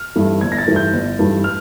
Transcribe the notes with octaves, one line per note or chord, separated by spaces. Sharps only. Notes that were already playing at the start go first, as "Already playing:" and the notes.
Already playing: F6
G2 E3 A3
G1 G#6
A#6
A6
G2 E3 A3
G6
G1
G2 E3 A3
F6